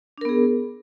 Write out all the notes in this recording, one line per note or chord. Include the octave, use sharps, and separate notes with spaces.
B3 D4 G#4 A#4